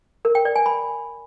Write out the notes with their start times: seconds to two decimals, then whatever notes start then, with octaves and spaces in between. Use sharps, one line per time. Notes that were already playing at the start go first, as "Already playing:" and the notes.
0.25 A#4
0.35 G5
0.45 D5
0.56 G#5
0.66 B5